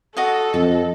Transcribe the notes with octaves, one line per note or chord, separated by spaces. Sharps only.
F#4 A4 D#5 F5
F2 D#5 A5